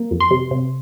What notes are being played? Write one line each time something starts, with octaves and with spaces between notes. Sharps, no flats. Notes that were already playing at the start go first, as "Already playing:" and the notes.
Already playing: A#3
F2
C6
C3
C3